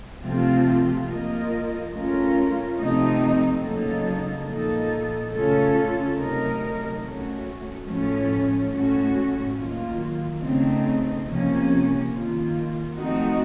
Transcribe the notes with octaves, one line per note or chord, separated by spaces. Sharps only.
C3 F3 A3 C4 F4
F3 A#3 F4 A#4 D#5
A3 C#4 F4 A#4
C3 F3 A3 C4 D#4
C#3 F#3 A#3 D#4 A4
A#2 F3 A#3 D#4 A4
C#3 A3 C#4 F4 A4
C3 F#3 A3 D#4 A#4
A3 C#4 F#4
A2 F3 A3 C#4
A2 A3 C#4 F#4
D#3 F#3 A#3 F4
C#3 A3 C4 D#4
C3 F3 A#3 C#4
D#3 A#3 F4
F3 A3 C4 D#4 F#4